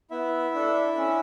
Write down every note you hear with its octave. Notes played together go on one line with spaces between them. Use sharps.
B3 E4 E5
D4 A4
C#4